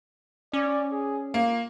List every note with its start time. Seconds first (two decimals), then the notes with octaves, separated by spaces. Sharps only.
0.53 C#4 D5
0.92 G#4
1.34 A#3 F4